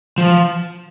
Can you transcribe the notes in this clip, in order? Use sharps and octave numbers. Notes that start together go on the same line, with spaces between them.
F3